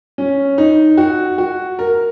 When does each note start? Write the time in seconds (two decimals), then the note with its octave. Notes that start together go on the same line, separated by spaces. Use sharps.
0.18 C#4
0.58 D#4
0.97 F#4
1.38 F#4
1.79 A#4